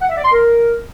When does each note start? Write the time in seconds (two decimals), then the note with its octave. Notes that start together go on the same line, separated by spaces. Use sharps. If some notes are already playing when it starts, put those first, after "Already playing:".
0.01 F#5
0.09 E5
0.17 D5
0.25 C6
0.32 A#4